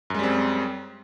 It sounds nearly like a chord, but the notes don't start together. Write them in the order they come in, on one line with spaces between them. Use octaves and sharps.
F#2 G#3 G3 C4